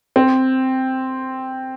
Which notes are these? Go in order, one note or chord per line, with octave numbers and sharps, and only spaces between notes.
C4